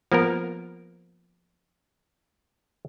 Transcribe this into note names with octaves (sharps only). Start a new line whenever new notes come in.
F3 A#3 B3 A#4